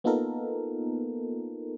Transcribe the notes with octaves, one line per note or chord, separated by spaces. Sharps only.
A#3 B3 D#4 F4 A4 A#4